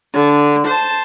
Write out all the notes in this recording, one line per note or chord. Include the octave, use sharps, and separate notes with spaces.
D3
C5 A5